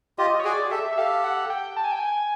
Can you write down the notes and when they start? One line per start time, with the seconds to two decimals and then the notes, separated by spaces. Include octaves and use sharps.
0.18 F4 G4 D#5
0.39 C#5
0.44 F#4 G#4 D5
0.71 G4 A4 E5
0.93 E5
0.97 G4 A4 F5
1.24 F#5
1.50 G5
1.77 A5
1.84 G#5
1.92 G5
2.00 G#5